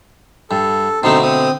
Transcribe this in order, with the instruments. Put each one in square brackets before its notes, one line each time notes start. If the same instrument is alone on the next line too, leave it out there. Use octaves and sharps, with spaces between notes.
[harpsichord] G2 [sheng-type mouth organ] A4
[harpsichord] B2 D3 A3 [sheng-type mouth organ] C4 D#4 C6
[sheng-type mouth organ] C4 D#6